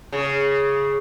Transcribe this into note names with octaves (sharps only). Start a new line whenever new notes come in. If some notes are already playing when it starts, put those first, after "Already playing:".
C#3